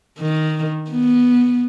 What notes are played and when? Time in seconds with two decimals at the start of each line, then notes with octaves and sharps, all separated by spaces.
0.19 D#3
0.91 B3